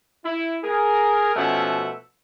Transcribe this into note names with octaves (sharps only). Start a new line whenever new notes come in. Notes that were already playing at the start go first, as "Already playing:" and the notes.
E4
G#4 A#4
B2 F3 A3 C#4 E5 F#5